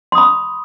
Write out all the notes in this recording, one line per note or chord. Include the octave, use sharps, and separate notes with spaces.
B5 C6 D#6